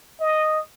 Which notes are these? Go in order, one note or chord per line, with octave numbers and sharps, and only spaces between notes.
D#5